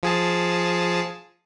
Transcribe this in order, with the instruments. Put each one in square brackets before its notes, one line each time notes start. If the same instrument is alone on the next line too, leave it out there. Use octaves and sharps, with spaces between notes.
[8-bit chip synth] F3 G#4 A5